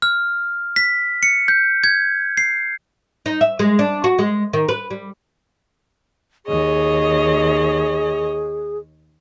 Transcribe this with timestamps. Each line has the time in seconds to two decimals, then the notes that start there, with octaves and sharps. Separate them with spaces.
0.02 F6
0.76 B6
1.23 C#7
1.48 G6
1.84 G#6
2.37 C7
3.26 D#4
3.41 E5
3.59 G#3
3.79 D4
4.04 F#4
4.19 G#3
4.53 D#3
4.69 B4
4.91 G3
6.46 D#2 G#4 C#5 D#5